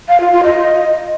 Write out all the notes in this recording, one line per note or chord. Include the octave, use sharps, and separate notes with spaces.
F5
F4
F4
D#5